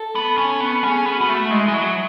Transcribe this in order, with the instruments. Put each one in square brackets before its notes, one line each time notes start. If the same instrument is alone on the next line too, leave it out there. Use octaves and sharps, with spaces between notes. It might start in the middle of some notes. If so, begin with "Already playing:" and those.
Already playing: [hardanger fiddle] A4
[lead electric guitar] B3
C#4
B3
[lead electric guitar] C#4 [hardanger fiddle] G#4
[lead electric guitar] B3
[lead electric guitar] B3 [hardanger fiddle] F#4
[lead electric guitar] A3
[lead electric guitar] G#3 [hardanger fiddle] E4
[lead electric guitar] G#3
F#3